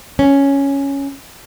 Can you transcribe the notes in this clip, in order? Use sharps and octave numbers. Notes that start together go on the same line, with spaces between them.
C#4